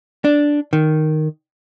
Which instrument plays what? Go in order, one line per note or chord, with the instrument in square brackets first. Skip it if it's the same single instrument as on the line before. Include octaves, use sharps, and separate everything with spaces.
[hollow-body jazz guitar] D4
D#3